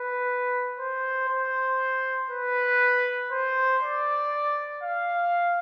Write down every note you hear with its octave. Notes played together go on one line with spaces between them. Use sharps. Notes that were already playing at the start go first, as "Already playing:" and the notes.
Already playing: B4
C5
C5
B4
C5
D5
F5